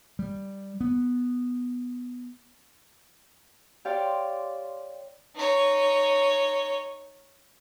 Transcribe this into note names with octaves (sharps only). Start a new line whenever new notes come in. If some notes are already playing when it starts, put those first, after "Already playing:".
G3
B3
G4 C#5 D5 F5 G5 C6
D#4 C#5